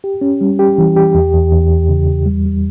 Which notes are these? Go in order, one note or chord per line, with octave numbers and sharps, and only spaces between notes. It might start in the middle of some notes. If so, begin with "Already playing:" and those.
G4
C#4
G3
G4
E3
G4
E2
E2
E2
E2
C#3
E2
G3
G3